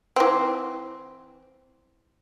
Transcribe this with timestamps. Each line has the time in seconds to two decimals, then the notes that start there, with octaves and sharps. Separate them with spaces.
0.16 E3 C4